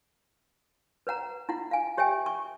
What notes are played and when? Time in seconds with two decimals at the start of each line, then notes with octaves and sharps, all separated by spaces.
1.07 B4 C#5 F#5 A#5
1.49 E4 F4 F#5
1.71 F5 G#5
1.97 G4 C#5 E5 G5 G#5
2.26 C#6